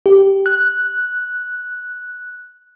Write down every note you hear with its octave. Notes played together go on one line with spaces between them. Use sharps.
G4
F#6